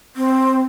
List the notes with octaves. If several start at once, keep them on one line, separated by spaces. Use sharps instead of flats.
C4